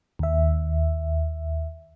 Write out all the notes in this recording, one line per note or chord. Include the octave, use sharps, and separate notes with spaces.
D#2 E5